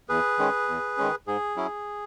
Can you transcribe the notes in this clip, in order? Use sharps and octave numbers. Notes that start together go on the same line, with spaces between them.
E2 G#4 B4
D#3 G#3 C#4
E2
D#3 G#3 C#4
G#2 G#4
F#3 C#4 E4